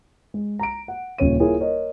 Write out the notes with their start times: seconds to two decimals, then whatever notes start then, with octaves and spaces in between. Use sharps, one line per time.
0.34 G#3
0.59 A#5 D7
0.88 F#5
1.18 D#1 C#3 C#5 D#7
1.40 E4 F4 G#4 A#4 C#5
1.60 A#4 C#5 D#5